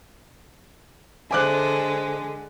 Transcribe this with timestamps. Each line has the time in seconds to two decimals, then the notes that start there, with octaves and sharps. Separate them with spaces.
1.31 D3 G#3 C5 D5 E5 G#5 D6 F#6